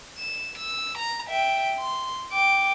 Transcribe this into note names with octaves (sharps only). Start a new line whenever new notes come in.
E7
E6
A#5
E5 G5
C6
G5 D6